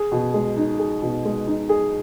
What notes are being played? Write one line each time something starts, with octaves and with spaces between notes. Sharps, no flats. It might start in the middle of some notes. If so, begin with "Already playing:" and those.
Already playing: G#4
B2
G#3
D#4
G#4
B2
G#3
D#4
G#4